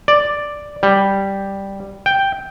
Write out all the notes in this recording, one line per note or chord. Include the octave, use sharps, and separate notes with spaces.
D5
G3
G5